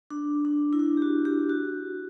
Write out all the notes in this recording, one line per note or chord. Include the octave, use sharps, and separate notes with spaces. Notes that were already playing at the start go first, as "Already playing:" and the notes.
D4
D4
E4
D4
G4
F#4
G4
F#4